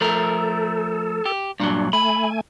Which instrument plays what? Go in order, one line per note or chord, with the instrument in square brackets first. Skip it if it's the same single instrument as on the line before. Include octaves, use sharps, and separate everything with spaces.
[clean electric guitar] F3 A3 A#4 [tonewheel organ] A4
[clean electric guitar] G4
[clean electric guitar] G2 A#2 F#3 [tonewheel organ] D4
[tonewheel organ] A3 G#5 [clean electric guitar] B5